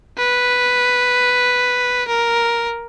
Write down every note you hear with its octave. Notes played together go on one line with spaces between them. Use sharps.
B4
A#4